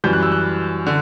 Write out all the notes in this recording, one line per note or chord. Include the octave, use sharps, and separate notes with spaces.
F#2 E3 G3 G6
F#6
E6
F#6
D3